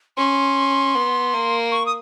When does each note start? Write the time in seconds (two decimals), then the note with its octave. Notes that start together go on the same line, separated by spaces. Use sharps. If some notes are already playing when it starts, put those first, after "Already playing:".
0.17 C#4 C6
0.95 B3
1.34 A#3
1.72 C#6
1.86 D#6